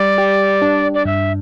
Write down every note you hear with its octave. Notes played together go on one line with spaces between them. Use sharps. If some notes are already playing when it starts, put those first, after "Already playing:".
Already playing: G3 D5
G4
D4
D5
G2 E5